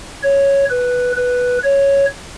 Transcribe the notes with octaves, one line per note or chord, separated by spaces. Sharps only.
C#5
B4
B4
C#5